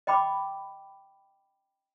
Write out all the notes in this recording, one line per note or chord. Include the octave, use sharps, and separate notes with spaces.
D#5 G5 B5 D6